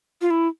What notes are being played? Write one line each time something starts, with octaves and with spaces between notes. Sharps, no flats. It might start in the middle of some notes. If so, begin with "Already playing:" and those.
F4
E4